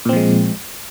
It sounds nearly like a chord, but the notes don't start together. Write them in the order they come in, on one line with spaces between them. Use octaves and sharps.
A#2 C4 F3 G#3